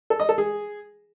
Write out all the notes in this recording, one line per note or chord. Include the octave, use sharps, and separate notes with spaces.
A4
D#5
A4
G#4